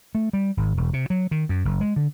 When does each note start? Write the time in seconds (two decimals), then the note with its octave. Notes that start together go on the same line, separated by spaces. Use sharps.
0.15 A3
0.33 G3
0.57 G#1
0.77 E1
0.93 C3
1.10 F#3
1.31 D#3
1.49 F#2
1.65 F#1
1.81 G#3
1.96 D3